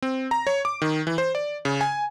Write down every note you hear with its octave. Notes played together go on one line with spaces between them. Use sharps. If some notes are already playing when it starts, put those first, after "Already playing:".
C4
A#5
C#5
D6
D#3
E3
C5
D5
C#3
G#5